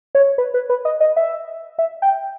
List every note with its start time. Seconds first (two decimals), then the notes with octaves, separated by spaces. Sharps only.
0.15 C#5
0.38 B4
0.54 B4
0.70 B4
0.85 D#5
1.00 D#5
1.16 E5
1.79 E5
2.02 G5